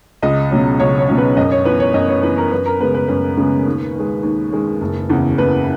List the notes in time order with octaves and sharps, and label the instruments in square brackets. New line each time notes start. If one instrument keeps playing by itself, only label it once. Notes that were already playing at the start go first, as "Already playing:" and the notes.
[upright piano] C#2 D#5
B2 F#3 C#4
C#2 C#5
C#5
B2 F#3 C#4
B4
F#2 D#5
C#5
E3 B3 B4
C#5
F#2 D#5
C#5
E3 B3 B4
A#4
F#2 B4
A#4
C#3 G#3 B3 B4
B4
F#2 B4
C#3 G#3 B3
D#2
D#3 G#3
D#2
D#3 G#3
F#1
E2 C#3
F#1 B4